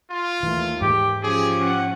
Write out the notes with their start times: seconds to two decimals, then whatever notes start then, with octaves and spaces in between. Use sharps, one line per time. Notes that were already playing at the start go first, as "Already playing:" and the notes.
0.11 F4
0.43 D#2 E3 A3
0.81 G#2 E3 G#3 G4
1.23 F3 C#4 G4 G#4
1.61 F#5